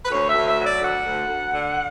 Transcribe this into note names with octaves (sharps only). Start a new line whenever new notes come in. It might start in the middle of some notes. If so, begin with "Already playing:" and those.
B4
D2 C#5
E5
D2
E5
F#3
D5
D2 F#5
D2
D2
D3